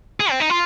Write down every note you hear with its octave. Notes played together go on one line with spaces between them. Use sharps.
G#4
C4
D#4
F4